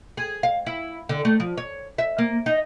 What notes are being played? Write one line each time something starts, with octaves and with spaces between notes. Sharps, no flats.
G#4
F5
E4
D3
A3
F3
C#5
E5
A#3
D#4